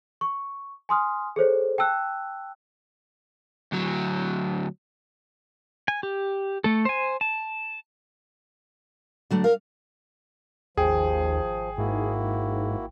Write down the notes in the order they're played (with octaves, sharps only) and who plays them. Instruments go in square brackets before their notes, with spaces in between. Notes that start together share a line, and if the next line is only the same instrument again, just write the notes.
[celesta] C#6
G#5 C6 D#6 F6
G#4 A4 C5 C#5
G5 A5 E6 F#6
[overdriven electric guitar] D2 F#3
[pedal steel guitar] G#5
G4
A3 A4
C5 G#5
A5
[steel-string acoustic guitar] D3 F#3 A3
[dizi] A#4 [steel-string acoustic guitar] F5
[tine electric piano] G#1 G5 [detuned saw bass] D#2 [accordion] F3 [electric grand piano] G#4
[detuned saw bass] G#2 [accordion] A#3 E4 F#4